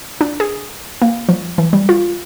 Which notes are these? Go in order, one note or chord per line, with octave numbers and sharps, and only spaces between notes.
D4
G#4
A#3
F3
E3
G3
F4